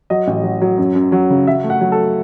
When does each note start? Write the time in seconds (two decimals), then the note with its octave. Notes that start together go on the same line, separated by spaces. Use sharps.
0.10 F#3 D#5
0.27 A1
0.43 F#3
0.61 F#3
0.78 F#2
0.95 F#2
1.12 F#3
1.30 C#3
1.47 F#3 E5
1.64 A3
1.70 F#5
1.81 F#3
1.92 A4